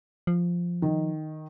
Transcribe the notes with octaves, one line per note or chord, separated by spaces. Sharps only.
F3
D#3